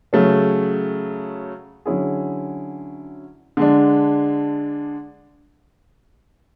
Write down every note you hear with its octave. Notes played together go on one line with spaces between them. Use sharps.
C#3 F#3 A3 C#4
D3 F#3 C#4 E4 G#4
D3 G#3 D4